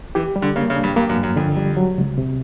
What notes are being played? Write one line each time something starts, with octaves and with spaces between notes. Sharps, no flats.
E3 G4
G3
D3
C#3 A#3
C#3
D4
G2
G2 A#3
F#2
G2
F#2
F2 D3
G3
F#3
C#2
C3